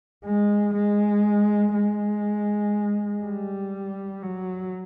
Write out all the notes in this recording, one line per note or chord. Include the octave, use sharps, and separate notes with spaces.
G#3
G#3
G#3
G3
F#3